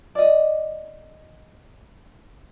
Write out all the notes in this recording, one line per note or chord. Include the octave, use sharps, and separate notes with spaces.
D5 D#5